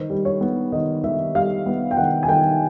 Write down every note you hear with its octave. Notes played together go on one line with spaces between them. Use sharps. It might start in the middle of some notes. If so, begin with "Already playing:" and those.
Already playing: D#3 C5
G3
C#5
B3
D#3 D#5
D#3 E5
G3 F5
B3
G5
D#3 F#5
G#5
D#3 G5